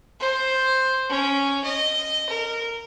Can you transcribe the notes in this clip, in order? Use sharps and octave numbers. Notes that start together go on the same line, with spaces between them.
C5
C#4
D#5
A#4